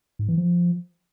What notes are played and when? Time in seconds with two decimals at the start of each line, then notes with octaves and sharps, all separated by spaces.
0.19 G#2
0.28 E3
0.37 F3